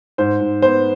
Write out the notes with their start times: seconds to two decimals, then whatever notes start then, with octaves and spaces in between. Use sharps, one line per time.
0.18 G#2 C5
0.40 G#2
0.62 B3 C5